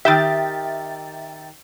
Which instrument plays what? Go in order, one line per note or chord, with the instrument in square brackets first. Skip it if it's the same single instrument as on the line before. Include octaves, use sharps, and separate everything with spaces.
[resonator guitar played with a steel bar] D#3 G4 [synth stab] E5 G5 A6